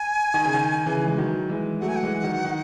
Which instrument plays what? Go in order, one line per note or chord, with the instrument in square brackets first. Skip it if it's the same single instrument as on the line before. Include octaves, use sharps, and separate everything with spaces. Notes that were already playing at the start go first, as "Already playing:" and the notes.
Already playing: [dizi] G#5
[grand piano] D#3
C#3
D#3
C#3 E3
G#3
D#3 F#3
E3 G#3
[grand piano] F#3 A3 [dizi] F#5
[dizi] G#5
F#5
[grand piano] E3 G#3
D#3 F#3
D#3